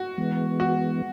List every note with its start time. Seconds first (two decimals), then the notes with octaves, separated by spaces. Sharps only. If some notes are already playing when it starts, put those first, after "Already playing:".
Already playing: F#4
0.18 E3 G#3 B3
0.60 F#4